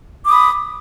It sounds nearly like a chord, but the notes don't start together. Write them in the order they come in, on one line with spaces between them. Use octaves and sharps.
D6 D#6 B5